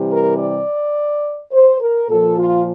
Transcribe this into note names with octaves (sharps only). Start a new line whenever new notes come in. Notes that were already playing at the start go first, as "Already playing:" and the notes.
Already playing: C3 E3 G3
A#4
D5
C5
A#4
A#2 F3 A4
F4